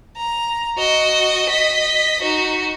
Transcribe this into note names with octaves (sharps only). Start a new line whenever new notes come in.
A#5
F#4 D#5
D#5 B6
D#4 F#4